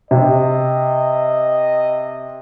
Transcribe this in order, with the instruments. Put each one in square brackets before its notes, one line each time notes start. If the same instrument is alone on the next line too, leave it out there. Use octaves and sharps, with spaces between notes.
[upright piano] C3 [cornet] D#5